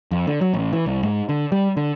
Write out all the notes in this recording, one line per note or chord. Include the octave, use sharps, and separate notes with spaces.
F2
D3
F#3
A1
E3
C2
G#2
D3
G3
D3